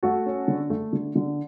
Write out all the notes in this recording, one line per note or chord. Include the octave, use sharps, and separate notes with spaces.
A3 F#4 A4
C#4
D3
A3
D3
D3